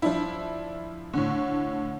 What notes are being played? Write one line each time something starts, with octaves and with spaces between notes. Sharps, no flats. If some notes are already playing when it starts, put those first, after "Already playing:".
F3 D4 E4
A2 D3